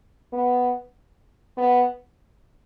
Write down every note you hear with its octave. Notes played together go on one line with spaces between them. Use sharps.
B3
B3